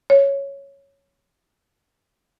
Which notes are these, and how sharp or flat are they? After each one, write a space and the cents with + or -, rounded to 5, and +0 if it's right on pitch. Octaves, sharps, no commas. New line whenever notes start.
C#5 +0